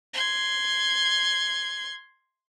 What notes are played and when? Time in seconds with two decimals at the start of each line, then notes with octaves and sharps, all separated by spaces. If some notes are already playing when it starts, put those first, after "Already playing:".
0.13 C6 G#6